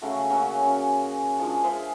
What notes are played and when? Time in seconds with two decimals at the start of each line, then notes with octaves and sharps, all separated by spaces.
0.02 C#3 F#3 A3 F#4
0.30 F#3 A#3 C#4 D#5
0.63 C#4 F#4
1.39 F3 G#3 D4
1.64 G#3 C5 E5 F5